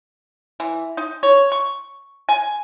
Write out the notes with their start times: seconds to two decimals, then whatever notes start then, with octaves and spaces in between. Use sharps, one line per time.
0.60 E3
0.97 D#4
1.23 C#5
1.52 C#6
2.29 G#5